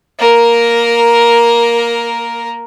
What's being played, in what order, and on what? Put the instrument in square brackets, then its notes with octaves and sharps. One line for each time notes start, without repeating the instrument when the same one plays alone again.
[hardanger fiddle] A#3 A#4